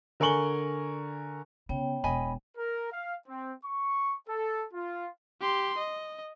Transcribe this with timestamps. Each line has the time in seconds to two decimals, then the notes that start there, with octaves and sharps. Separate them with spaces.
0.20 D3 A#4 G#5 C#6 F#7 G7
1.69 C#3 B3 C#5 G5
2.04 E1 D#5 G#5 B5
2.57 A#4
2.92 F5
3.28 C4
3.64 C#6
4.29 A4
4.74 F4
5.41 G4 C6
5.78 D#5